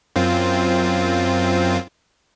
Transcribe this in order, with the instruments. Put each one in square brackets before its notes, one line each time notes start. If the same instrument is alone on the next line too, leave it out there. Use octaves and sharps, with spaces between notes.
[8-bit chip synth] F#2 C4 F4